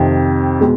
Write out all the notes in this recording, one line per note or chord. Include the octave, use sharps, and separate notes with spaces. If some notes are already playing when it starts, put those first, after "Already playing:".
Already playing: F2 C3 D#3
B2 G#3